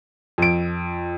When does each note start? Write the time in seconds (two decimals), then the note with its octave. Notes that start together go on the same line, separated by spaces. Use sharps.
0.38 F2 D7